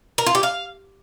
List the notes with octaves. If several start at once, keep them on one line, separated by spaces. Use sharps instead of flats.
A#4
F4
G4
F5